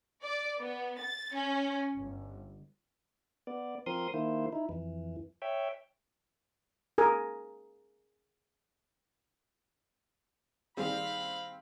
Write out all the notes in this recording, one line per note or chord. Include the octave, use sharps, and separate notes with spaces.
D5
B3
A6
C#4
G1
B3 D5
F3 C4 A#4 C6 D#6
D#3 A#3 E4 C5
D#4 E4
F2 E3
C#5 E5 G5
G#4 A#4 G#5
D#3 G3 C4 G#4 F5 B5